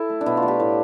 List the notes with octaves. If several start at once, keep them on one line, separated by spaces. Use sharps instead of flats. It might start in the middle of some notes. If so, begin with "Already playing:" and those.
Already playing: E4 A4
A3
D4
B2 E4
F4
A3
G4
A2